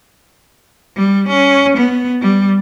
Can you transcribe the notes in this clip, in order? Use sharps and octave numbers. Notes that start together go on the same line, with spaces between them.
G3
C#4
B3
G3